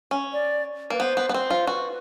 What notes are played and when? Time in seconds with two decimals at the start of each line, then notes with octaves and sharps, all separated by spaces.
0.11 C#4
0.33 D5
0.90 A#3 B4
1.00 B3 C5
1.17 B3
1.29 B3
1.34 C4 C5
1.50 F4
1.67 F#4 B4